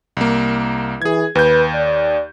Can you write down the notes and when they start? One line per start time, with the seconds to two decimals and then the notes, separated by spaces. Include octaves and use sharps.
0.17 C2 A#3
1.02 E3 G#4 G#6
1.35 D#2 B4 G6
1.74 D5